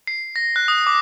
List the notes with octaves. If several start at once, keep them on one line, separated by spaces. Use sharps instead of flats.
C7
A#6
F#6
D#6
D6